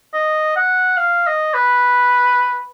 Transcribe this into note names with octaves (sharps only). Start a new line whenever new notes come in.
D#5
F#5
F5
D#5
B4